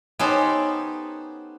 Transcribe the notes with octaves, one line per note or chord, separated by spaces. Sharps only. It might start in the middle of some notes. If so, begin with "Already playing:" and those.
B3 C#4 D#4 G4 A4 C5